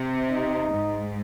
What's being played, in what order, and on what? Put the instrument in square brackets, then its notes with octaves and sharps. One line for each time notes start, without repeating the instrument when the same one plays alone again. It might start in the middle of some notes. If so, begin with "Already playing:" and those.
Already playing: [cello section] C3
[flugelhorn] D#4
[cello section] G#2